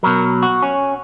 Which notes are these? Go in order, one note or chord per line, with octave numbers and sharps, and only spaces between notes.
B2 F#3 A#4
F#4
C#4